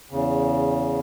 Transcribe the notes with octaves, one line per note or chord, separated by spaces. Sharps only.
E2 C#3